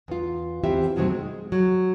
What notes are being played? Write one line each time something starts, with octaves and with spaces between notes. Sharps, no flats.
E2 F4
E2 E3 C4 F4 G4 E5
F2 B2 D#3 F#3 A3 C4
G#3
F#3